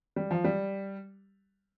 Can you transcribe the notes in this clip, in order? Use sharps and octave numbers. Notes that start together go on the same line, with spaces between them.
G3
F3
G3